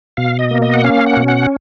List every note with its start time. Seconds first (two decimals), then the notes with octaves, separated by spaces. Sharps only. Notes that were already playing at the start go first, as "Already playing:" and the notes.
0.17 B2 F5
0.39 D#5
0.51 A#3
0.62 D#5
0.74 F#5
0.84 C#4 F5
1.06 F#5
1.17 B2
1.28 F#5